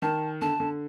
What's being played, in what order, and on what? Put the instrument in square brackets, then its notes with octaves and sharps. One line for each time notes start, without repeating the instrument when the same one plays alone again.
[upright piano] D#3 [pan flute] A5
[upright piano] D3 [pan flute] A5
[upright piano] D3